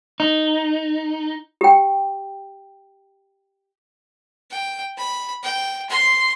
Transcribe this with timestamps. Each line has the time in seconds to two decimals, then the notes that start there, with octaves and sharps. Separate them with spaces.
0.20 D#4
1.61 G4 G5
4.50 G5
4.97 B5
5.43 G5
5.89 C6